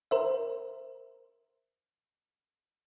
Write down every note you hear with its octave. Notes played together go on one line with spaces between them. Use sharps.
A#4 C5 E5